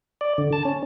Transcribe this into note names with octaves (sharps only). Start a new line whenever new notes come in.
D5
D3
A5
C#4